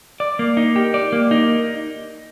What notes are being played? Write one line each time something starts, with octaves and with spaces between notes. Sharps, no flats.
D5
A#3
D#4
G4
D5
A#3
D#4